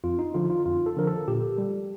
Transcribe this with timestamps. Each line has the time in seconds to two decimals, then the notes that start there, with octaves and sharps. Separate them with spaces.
0.04 F2 F4
0.19 D#4
0.34 D3 F3 F4
0.50 F4
0.66 F2 F4
0.86 A4
0.97 D3 F3 A#4
1.07 A4
1.28 A#2 G4
1.58 G3